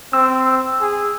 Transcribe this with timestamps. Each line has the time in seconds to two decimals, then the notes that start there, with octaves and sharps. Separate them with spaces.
0.13 C4 E6
0.81 G#4